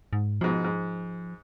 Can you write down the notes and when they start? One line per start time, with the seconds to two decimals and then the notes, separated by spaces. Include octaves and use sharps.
0.13 G#2
0.41 G#2 B2 F3
0.64 G#2